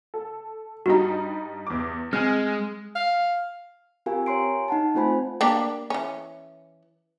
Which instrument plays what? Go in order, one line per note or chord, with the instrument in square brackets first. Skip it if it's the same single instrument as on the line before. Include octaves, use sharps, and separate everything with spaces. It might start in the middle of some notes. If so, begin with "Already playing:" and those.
[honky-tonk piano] A4
[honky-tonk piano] G2 G3 D#4 [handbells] F#4 A#5
[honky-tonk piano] E2 D6
[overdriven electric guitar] G#3 [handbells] C4 [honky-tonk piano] G#5 F6
[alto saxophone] F5
[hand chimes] C4 F4 G4 A#4 F5 G#5
C#5 G#5 A#5 C6 C7 D7
D#4 F#5 A5
A3 C4 F4 C5 G#5 B5
[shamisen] A#3 D4 G4
E3 C#4